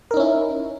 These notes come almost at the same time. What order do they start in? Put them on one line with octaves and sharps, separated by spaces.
A#4 D#4 C#4 E4